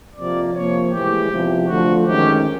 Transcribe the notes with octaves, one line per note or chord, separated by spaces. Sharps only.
F2 C3 F3 A#3 D5
C3 F3 A#3 C#5
A2 E3 G#3 G4
E2 C3 F3
D3 F3 A3 F#4
F#2 D#3 G#3 C#4 G4